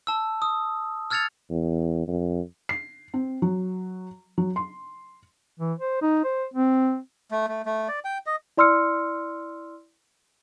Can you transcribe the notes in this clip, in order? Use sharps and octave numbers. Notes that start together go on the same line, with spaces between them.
A5 E6
D#6
E6 F6 G#6 A6 C#7 F7
E2
F2
C7
C4
F#3
F#3
C6
E3
C5
D#4
C5
C4
A3
A3
A3
D5
G5
D#5
E4 D5 C6 E6 F6 C#7